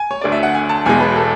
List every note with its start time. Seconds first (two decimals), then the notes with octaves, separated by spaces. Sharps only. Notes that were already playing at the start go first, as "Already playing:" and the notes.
Already playing: G#5
0.11 C#5
0.21 D2 D3 A3 D5
0.32 E5
0.43 F#5
0.54 G#5
0.69 A5
0.85 E1 E2 B2 G#3 G#5
1.01 B4
1.16 A4